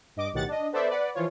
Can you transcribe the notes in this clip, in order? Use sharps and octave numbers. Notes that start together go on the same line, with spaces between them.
G2 D#5 D6
B1 A2 D#3 G4 F#5 A6
D4 D#5
B3 A4 C5 D5 E5
B4 D5 F#5
E3 F3 F4 C#5